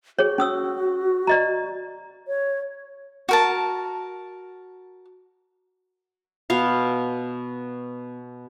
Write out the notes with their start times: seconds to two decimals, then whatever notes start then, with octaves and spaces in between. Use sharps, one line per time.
0.19 F#4 G#4 C#5
0.38 C#4 D#6 E6
1.27 D5 D#5 A#5
2.28 C#5
3.29 F#4 A#4 A5
6.50 B2 B3 F5